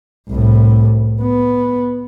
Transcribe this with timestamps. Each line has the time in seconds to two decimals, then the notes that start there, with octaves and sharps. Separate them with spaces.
0.30 C2 A2
1.22 B3